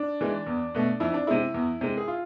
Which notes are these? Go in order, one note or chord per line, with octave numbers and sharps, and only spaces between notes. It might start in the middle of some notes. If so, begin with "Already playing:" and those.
Already playing: D4
E3 G#3
E2
B2 A3
F2 E4
D4
C3 G#3 E4
E2
C3 G#3
G#4
F4